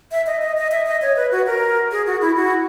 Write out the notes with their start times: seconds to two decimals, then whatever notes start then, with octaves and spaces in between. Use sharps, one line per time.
0.11 E5
0.27 D#5
0.42 D#5
0.57 D#5
0.72 E5
0.86 D#5
1.02 C#5
1.16 B4
1.32 F#4
1.46 A#4
1.91 G#4
2.06 F#4
2.21 E4
2.36 F#4